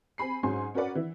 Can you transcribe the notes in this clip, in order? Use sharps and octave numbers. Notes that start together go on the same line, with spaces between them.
C4 G#5 B5 C7
G#2 F#3 C#4 G#5 C6
C#4 F#4 A#4 B4 D5 F#5
E3 E4